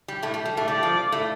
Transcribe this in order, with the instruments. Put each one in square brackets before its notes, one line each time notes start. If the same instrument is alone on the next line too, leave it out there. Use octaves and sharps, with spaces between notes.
[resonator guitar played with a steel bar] G3
A2 A3
G3
G3
A2 A3
[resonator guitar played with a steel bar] G3 [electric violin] D5
[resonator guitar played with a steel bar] F3
A2 A3